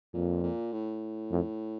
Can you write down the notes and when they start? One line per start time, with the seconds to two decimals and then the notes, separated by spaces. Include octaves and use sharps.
0.14 F2 A#2
0.43 A#2
0.72 A2
1.31 F2